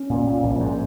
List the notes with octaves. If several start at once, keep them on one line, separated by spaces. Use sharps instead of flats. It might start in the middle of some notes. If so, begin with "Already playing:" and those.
Already playing: C#4
A#2
A#2
A#1
G#2